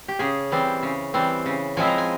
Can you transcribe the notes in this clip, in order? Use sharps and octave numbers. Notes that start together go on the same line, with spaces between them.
G4
C#3 G#4
E3 G3 C4
C#3
E3 G3 C4
C#3
F3 G#3 C4 E4 G#5
A#5
G#5